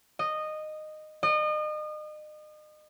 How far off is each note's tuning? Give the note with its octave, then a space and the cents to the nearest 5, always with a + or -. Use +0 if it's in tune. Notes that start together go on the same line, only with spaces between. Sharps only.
D#5 -15
D#5 -35